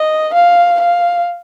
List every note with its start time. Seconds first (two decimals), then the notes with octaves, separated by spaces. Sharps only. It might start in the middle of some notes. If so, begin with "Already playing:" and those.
Already playing: D#5
0.33 F5
0.80 F5